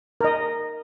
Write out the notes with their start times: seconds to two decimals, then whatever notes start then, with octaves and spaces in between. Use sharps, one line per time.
0.21 A#4 D#5